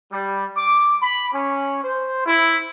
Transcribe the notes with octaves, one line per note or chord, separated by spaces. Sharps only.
G3
D6
B5
C#4
C5
E4